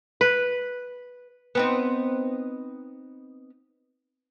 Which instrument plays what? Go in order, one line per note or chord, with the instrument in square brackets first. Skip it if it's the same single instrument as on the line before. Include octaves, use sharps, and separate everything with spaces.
[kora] B4
[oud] B3 C4 D#4